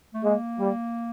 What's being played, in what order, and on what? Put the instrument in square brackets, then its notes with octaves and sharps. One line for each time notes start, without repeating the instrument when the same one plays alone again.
[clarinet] A3
[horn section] G#3 [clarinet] A#3
[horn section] G3